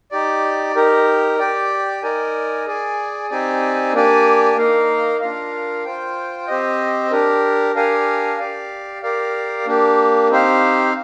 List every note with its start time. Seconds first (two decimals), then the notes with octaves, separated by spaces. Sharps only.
0.12 D#4 G4 D5
0.75 D#4 G4 A#4
1.39 G4 D5 G5
2.03 D#4 A#4 D5 G#5
2.67 G#4 D5 G#5
3.30 C4 D#4 G4 D5 G#5
3.93 A#3 D4 G4 D5 G#5
4.57 A#3 D#4 A#4 F5
5.21 D4 F4 A#4 F5
5.85 F4 C5 G5
6.48 C4 G4 C5 D#5
7.11 D4 G4 A#4
7.75 D4 G4 A#4 F5 G#5
8.38 G4 D5 F5
9.02 G4 A#4 D5 F5
9.66 A#3 D4 G4
10.30 C4 D#4 G4 C5 F5